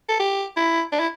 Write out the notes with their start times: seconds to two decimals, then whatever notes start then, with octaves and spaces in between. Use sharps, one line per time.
0.09 A4
0.20 G4
0.56 E4
0.92 D4
1.00 E4